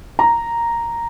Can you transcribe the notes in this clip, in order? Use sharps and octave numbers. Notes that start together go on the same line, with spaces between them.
A#5